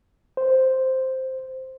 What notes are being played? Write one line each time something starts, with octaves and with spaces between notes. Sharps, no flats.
C5